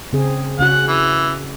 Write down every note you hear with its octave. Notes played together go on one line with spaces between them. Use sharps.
C#3 C4 G#4
C#3 C#4 F#4 F#5
E3